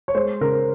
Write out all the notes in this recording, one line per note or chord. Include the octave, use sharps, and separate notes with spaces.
C#5
G#3 C5
C#3 A#4